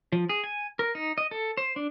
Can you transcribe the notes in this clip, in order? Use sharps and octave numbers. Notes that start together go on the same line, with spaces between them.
F3
G#4
G#5
A#4
D#4
D#5
A4
C5
D4